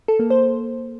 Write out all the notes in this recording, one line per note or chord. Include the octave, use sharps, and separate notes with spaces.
A4
A#3
C5